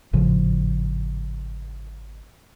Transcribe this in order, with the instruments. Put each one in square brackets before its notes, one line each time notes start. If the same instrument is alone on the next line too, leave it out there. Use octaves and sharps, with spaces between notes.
[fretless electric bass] G#1 A2 C#3 F3